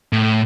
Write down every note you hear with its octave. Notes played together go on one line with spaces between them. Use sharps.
A2